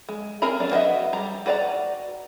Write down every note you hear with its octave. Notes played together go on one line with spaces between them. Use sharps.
G#3
C4 G#4 A#4 A#5 B5
F#3 G#3 C#4 D4
F#4 B4 D#5 E5
G3 A#5
F#4 B4 D5 F#5 A#5